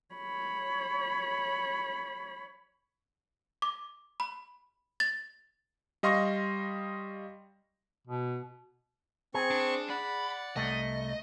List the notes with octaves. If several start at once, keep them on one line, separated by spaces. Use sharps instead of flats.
C#5 B5
D6
B5
A6
G3 D#5 F5 C6 C#6 A#6
B2
C4 G#4 C#6
D4
D5 F#5 B5
C2 A3 D#5